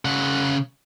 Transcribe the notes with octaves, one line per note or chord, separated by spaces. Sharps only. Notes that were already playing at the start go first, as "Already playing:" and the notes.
C#3 F#5